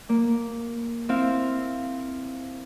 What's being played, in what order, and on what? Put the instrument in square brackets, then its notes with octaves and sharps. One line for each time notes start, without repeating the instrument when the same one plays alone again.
[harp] A#3
C4 E4 F5